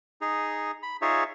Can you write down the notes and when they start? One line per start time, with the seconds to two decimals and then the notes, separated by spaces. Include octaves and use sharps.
0.21 D#4 G#4
0.83 B5
1.02 D#4 F4 G#4 C#5 E5